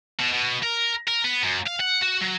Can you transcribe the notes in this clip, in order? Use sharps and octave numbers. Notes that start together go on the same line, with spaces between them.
B2
B2
A#4
A#4
B3
F#2
F5
F#5
F#4
F#3